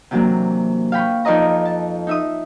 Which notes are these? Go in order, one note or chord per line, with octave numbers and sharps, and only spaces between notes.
C3 E3 F#3 A#3 D4
F5 G5 B5 C#6
F2 D#4 B4 D5 D#5 A#5
A5
D#4 E5 D#6